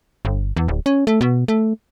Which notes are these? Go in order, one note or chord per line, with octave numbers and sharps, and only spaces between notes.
G1
E2
D1
C#4
A3
B2
A3